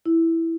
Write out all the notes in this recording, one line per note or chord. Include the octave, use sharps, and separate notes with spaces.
E4